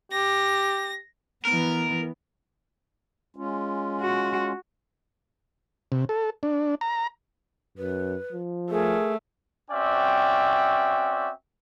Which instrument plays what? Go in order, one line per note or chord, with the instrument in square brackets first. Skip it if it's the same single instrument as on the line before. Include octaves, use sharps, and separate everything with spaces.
[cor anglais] G4 [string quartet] A#6
[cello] E3 B3 [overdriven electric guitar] A#4
[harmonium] G#3 C#4 F4
[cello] F#4
[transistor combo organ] C3
A4
D4
A#5
[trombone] F#2 [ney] B4
[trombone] F3
[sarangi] A3 [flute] G#4 [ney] A#4
[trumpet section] C4 C#4 F#4 D5 E5 G5